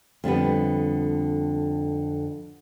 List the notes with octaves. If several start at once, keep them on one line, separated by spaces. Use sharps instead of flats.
F2 D3 G3 B3